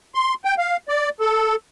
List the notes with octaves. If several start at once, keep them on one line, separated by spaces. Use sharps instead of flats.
C6
G5
F5
D5
A4